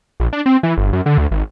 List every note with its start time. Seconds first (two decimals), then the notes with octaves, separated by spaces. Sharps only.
0.20 A#1
0.33 D4
0.46 C4
0.63 E3
0.77 G1
0.93 F#2
1.06 D3
1.18 D2
1.31 G#1